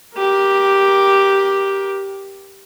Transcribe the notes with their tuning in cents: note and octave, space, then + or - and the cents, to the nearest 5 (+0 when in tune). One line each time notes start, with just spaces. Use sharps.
G4 +0 A#4 +25